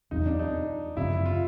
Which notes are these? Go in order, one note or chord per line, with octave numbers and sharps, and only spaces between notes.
E2 B2 F#3 D#4
D4
D#4
F#2 C#3 F3 E4
F4